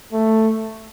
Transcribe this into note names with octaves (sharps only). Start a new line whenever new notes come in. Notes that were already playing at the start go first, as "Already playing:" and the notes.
A3